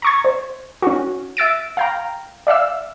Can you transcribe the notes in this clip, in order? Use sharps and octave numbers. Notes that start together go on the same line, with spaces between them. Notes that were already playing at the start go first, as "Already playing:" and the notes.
A#5 C#6 G#6
C5
C#4 F#4
E5 E6 A6 D7
F5 G5 A#5
D5 E5 F5 E6